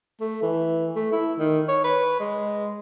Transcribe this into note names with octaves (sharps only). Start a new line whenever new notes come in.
A3
E3
A3
E4
D#3
C#5
B4
G#3